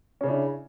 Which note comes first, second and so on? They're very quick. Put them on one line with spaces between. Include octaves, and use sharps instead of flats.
C#4 C#3 D4 E4